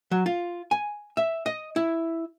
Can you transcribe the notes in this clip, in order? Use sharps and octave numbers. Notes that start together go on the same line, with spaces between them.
F#3
F4
G#5
E5
D#5
E4